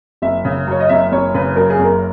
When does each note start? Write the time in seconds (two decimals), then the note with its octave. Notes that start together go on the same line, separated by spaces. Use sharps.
0.22 F#1 E5
0.45 C#3
0.67 F#2 C#5
0.80 D#5
0.89 F#1 E5
1.12 F#1 C#5
1.34 C#3 B4
1.56 F#2 A#4
1.70 G#4
1.79 F#1
1.84 A#4